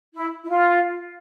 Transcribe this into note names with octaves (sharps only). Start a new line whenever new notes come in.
E4
E4
F4